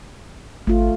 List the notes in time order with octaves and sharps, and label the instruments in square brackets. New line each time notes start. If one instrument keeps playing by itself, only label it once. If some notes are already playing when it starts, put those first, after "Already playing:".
[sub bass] G#1 [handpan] A3 F4